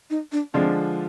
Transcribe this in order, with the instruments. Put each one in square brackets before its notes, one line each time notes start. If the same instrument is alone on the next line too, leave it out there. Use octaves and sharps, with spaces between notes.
[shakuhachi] D#4
D4
[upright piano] D3 F3 G#3 D4 F4 [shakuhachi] C4